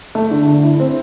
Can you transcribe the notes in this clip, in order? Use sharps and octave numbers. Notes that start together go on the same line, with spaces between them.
A3
D3
D3
E4
C4